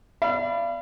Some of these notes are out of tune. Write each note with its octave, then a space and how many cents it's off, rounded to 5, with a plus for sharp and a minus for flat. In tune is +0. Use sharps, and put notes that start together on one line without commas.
D5 +0 F5 -40 B5 +5